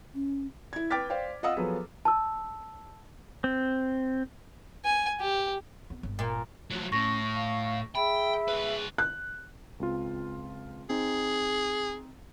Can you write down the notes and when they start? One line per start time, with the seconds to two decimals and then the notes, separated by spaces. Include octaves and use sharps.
0.14 C#4
0.73 E4 G#6
0.90 B4 G5 D6 F6 A6 B6
1.10 C5 D5 F5 G5
1.43 F4 D#5 F5 F#5 D#6 E6
1.56 F3 F#3 B3 G#4 A4 B4
2.05 A5 E6
3.44 C4
4.85 G#5
5.20 G4
5.90 B3
6.03 G1
6.19 A#2
6.70 F3 F#3 A3
6.92 A2 C#4 C#6 A#6
7.34 F5
7.95 G#4 E5 G5 B5
8.48 C2 B4
8.98 F#6
9.80 C#2 C4 F4
10.90 C4 D#4 G#4